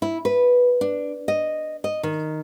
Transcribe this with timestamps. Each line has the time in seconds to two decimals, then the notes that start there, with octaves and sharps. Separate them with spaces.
0.02 E4
0.25 B4
0.81 D4
1.28 D#5
1.84 D#5
2.03 D#3